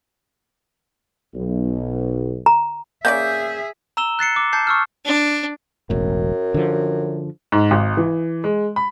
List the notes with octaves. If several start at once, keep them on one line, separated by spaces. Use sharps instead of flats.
B1
A#5
A#3 C#4 G#4 D5 E5 G6
A#5 E6 E7 G7
F#6 A6 C7 C#7
D6
A5 G6 C7
C#6 E6 F6
D4
E1 A1 F#2
D3 F3
G#2
G#1
E3
G#3
B5